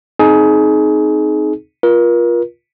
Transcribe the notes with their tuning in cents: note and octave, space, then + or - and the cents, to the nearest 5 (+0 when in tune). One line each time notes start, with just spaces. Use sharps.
C4 +0 D#4 +0 G#4 +25
F4 +0 A#4 +40